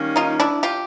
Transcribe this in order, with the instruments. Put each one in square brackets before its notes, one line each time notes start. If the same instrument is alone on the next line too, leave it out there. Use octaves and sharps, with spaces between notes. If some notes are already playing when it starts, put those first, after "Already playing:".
Already playing: [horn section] D#3 G3 A#3 C#4
[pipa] D#4 F4
D4 E4
F4 G4